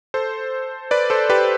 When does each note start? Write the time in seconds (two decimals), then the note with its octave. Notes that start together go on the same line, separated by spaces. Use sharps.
0.14 A4 C5
0.91 B4 D5
1.10 A4 C5
1.30 G4 B4